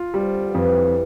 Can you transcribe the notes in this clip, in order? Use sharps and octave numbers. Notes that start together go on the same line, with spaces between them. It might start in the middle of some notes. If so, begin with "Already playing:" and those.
Already playing: F4
C3 G3
D3
F3
F2 E3